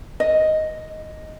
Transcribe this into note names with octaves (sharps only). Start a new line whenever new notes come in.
D#5